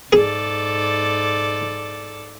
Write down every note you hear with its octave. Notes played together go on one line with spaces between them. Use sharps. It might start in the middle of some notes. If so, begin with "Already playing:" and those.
G#2 G#4 A4 D5